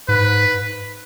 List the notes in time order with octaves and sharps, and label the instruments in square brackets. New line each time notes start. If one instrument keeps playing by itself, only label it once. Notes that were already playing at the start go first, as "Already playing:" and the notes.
[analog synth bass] G#2 [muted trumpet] B4